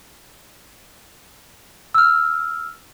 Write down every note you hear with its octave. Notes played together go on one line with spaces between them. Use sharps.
E6 F6